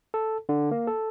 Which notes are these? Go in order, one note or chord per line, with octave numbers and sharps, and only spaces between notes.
A4
D3
A#3
A4